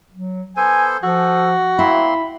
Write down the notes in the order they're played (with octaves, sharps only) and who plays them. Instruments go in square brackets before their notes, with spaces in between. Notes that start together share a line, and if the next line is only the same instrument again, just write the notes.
[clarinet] F#3
[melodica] B3 A4 C5 [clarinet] G#5
[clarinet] F3 [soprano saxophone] F#4 [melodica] A4
[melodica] A#3 C4 C6 [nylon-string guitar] E4 [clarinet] B5